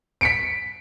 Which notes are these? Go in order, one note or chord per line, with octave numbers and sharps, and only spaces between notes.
B6 C#7 D7